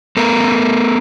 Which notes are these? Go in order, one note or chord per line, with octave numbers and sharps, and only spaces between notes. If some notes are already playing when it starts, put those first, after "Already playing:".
A3 B3 A#4